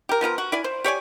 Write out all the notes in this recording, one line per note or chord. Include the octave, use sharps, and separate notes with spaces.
G4 A#4
F3 B3 F4 A#4
F#4
E4 D5 G#5
C5
G4 C#5 D5 G#5